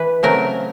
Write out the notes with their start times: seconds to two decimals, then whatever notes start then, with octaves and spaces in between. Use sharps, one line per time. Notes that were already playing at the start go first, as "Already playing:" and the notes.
Already playing: E3 B4
0.23 C#3 F#3 A3 C4 A#4